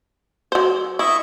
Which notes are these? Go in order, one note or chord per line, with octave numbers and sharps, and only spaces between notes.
F#3 C5
E4 D#5 E5 C#6